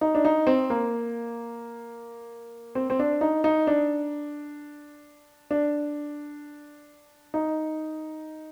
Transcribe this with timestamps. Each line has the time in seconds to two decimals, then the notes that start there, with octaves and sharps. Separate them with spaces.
0.01 D#4
0.15 D4
0.25 D#4
0.47 C4
0.70 A#3
2.75 C4
2.90 C4
2.99 D4
3.21 D#4
3.44 D#4
3.67 D4
5.51 D4
7.34 D#4